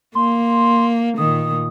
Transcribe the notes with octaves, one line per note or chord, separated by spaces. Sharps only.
A#3 C6
A#2 D#3 D#6